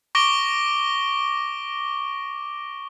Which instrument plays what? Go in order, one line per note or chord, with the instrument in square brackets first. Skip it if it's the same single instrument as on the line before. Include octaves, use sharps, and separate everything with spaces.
[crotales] C#6 D6 A#6 D7 G7